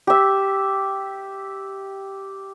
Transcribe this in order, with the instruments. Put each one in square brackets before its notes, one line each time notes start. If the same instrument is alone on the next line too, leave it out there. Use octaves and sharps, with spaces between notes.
[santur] G4 E5